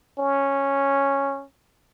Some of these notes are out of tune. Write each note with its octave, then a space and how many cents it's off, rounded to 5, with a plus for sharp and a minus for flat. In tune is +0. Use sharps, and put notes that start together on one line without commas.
C#4 -5